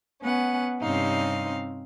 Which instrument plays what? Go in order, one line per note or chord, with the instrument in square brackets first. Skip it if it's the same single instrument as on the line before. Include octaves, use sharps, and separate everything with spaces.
[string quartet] B3 C#4 F#5
G2 C3 C4 C#4 D#4 F5